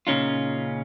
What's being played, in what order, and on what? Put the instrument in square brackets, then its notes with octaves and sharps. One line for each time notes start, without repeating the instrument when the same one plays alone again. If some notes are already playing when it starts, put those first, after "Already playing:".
[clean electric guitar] A#2 C#3 C#4 D#4 F4